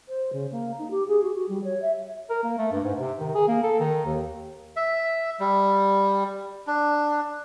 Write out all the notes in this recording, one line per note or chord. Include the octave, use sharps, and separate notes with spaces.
C5
C#3
A#3
D#4
G4
G#4
F#4
F#4
G3
C#5
E5
A#4
A#3
A3
G2
G#2
C3
D#3
G#4
A#3
A4
D#3
D#2
E5
G3
D4